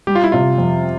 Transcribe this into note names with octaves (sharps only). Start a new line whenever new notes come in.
G3 G4
F4
E4
C3 F4
F2